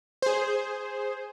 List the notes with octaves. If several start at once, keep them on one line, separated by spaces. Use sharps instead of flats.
G#4 C5